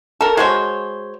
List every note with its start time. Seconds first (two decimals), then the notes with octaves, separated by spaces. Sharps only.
0.21 A4 A#4
0.37 G#3 F#4 C5 C#5